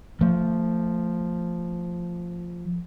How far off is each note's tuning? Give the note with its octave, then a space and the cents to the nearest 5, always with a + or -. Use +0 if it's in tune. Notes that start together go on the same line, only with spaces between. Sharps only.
F3 +0 A3 +30